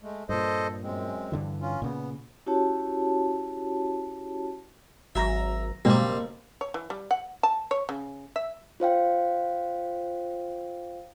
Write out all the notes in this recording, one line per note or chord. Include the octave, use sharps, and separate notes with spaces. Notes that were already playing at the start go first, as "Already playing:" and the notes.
G#3 A3
G2 A#2 A4 C5 D#5
F#2 G#3 C4
G2 D3 E3
C#4 F4
A#2 C#3 B3
C#4 E4 F#4 G4 C#5 A5
G#1 F#3 E5 A#5 A#6
F#1 B2 G3 G#3 A#3 C4
C#5
E3
G3
F#5
A5
C#5
C#3
E5
F4 C5 F5 G5